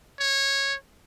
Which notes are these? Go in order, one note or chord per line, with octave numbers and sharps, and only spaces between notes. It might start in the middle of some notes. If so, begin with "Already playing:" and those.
C#5